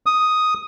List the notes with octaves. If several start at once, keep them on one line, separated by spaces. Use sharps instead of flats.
D#6